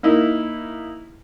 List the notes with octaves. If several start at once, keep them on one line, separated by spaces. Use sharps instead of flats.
A#3 D#4 E4